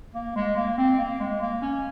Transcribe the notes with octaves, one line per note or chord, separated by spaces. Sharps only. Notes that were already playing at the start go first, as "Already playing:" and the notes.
A#3
G#3
A#3
C4
A#3
G#3
A#3
C#4